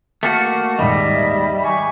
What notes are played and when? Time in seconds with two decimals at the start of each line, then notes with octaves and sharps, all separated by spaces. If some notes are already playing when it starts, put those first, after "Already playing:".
0.23 A3 A#3 F#4 A5
0.79 D#2 G#2 G3 D#5 E5
1.64 G4 G#5 C#6